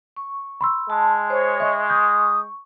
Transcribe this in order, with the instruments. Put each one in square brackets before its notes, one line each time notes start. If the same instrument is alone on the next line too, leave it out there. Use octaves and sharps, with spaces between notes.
[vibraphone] C#6
[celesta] B5 C6 E6
[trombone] G#3 [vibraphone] A5
[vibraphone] C5 [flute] C#5
[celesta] D#5 E5 [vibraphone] C#6
[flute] D#6 [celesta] G6